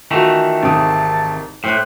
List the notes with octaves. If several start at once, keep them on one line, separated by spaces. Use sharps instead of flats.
D#3 E3 A3 F4 F#4
G#1 C3 A5 D#6
A2 C5 G5 F#6